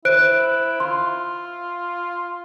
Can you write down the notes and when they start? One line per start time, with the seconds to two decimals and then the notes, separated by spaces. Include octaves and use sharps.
0.05 E4 C5 F#6 D7
0.80 F4 C6